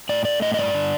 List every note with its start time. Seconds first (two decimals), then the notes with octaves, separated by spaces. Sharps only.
0.09 A2 D5
0.25 A3 D5
0.42 A2 D#5
0.54 D#5
0.58 G2 D5
0.74 D3